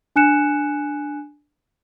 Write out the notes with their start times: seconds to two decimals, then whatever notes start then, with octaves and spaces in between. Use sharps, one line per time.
0.16 D4 G#5 F#6 C#7 E7